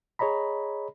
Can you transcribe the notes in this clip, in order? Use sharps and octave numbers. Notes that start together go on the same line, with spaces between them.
G#4 C#5 D#5 A#5 B5